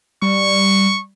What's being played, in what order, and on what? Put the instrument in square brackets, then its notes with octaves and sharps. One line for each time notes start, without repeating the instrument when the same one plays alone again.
[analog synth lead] G3 [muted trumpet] C#6